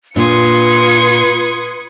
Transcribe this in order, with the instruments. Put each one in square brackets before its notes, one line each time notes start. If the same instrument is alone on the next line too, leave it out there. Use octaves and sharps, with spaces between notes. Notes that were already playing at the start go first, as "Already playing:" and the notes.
[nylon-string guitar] A#2 D4 [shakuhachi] F4 [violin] B4 C#7 [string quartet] C6 D#6 G#6